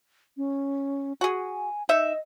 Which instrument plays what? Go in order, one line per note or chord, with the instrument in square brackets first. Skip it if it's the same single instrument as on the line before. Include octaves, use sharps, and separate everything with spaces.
[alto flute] C#4
[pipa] F#4 G#4 [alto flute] G#5
[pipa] D#4 E5 [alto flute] D#5